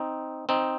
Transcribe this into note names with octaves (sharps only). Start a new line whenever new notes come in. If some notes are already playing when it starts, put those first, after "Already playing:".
Already playing: C4 D#4
C4 D#4